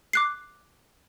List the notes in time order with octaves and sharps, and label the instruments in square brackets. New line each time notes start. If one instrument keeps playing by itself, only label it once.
[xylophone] D6 F#6 C7